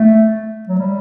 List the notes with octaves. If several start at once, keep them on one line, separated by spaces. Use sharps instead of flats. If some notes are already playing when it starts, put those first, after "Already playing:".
Already playing: A3
F#3
G3